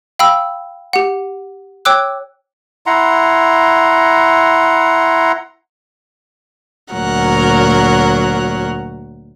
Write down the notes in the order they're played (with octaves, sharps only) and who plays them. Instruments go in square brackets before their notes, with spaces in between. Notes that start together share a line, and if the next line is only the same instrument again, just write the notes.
[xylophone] F5 G5 B5 E6
G4 F#5
C#5 G5 D6 E6 F#6
[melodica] E4 F#5 A#5 C6
[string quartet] D2 A#2 F#3 A#4 F#5